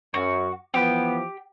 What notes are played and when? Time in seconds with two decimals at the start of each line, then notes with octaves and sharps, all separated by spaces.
0.14 F#2 F#4
0.74 E3 F3 B3 G4